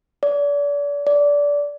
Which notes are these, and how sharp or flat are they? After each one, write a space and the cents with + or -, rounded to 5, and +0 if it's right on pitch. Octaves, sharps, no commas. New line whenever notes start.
D5 -35
D5 -20